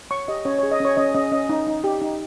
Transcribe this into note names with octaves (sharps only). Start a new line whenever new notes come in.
C#5 C#6
G4 D#5
C#4 C#5
C#5
G#4
D#5
C#4 C#5
C#4 D#5
C#4 D#5
C#4 D#5
D#4
D#4
G4
D#4